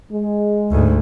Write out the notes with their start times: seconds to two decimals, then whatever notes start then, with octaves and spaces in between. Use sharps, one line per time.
0.10 G#3
0.71 D2 G#2